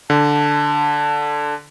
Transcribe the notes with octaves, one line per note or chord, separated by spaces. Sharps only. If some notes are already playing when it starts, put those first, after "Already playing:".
D3 A5